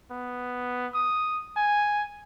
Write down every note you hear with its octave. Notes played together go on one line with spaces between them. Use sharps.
B3
D#6
G#5